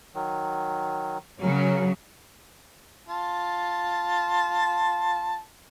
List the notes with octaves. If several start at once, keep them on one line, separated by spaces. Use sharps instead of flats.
D#3 F#3
C#3 F#3 C#4 A#4
F4 A5 C6